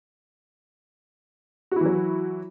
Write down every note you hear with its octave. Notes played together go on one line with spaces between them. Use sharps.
E3 F#3 E4 F#4